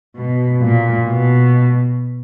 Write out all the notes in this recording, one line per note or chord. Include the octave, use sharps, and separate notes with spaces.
B2
A#2
B2